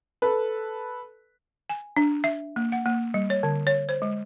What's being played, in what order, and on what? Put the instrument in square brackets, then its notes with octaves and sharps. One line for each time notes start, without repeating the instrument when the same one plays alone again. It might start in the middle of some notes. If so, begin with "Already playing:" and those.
[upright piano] A4 B4
[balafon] G#5
D4
E5
A#3
F#5
A#3
G3
C#5
D3
C#5
C5
G#3